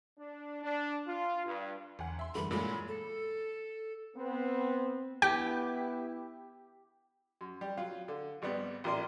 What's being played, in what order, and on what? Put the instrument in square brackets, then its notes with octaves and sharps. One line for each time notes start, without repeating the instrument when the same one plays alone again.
[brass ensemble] D4
D4
F4
G2
[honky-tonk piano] G1 F#5 [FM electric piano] E2 G#5
[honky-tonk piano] E5 C6
[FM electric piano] F#2 E3 G3 [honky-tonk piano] D3 A3 A#3 [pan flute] B5
[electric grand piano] A#2 G#3 [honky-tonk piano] F#3 A3 E4 [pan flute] B5
[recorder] A4
[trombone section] B3 C4
[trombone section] B3 E4 [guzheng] G4 [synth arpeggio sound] G5
[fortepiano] F#2
G3 G4
F#3 F4
D3
G#1 G3 B3
A1 A#2 A#4 D5 C6